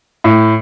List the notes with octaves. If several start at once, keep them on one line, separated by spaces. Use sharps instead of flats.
A2